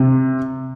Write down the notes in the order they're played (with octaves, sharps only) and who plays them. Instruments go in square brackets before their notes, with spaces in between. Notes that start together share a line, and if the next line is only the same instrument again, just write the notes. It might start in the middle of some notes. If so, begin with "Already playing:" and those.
Already playing: [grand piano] C3